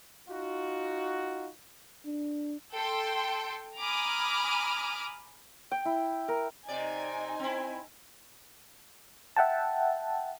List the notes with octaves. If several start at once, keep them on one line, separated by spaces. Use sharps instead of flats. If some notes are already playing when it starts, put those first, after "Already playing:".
D#4 F4 F#4
D4
A4 G5 C6
G#5 A#5 B5 D6 D#6 F6
G5
E4
A#4
C3 D#4 D5 G#5
C4 E4
E5 F#5 G5 A5